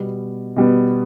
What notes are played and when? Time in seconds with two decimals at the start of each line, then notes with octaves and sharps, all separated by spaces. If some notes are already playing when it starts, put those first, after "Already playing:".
Already playing: B2 G3 B3
0.56 B2 G3 B3